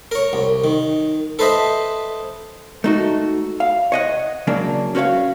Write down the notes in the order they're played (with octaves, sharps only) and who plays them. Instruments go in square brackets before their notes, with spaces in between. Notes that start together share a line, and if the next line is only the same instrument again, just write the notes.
[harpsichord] A#4 C#5
C2
D#3
A4 B4 C5 D#5 E5
[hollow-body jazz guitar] A3 D#4 F#4
F5
C#5 D#5 F#5
C#3 F#3 A#3 D4
C#4 F#4 C5 C#5 F5